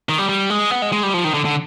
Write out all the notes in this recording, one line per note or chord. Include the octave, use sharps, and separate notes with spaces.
D#3
G3
G3
G#3
B3
G#3
G#3
G3
F3
D#3
D3
D3